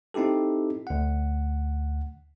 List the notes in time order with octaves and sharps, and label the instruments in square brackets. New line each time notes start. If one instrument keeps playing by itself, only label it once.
[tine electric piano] C4 D#4 E4 G4 A4
D2 F#5